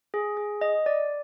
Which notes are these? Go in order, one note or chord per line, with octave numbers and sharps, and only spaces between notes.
G#4
G#4
D#5
D5